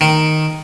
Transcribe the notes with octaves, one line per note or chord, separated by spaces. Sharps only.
D#3